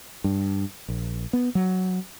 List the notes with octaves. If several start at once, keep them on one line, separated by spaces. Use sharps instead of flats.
G2
A#1
B3
F#3